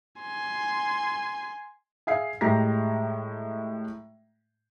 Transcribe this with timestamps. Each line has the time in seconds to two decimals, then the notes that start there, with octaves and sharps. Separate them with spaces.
0.21 G#5 C6
2.07 G#4 E5 F5 C7
2.41 A2 G#3 G4 A#5 A#6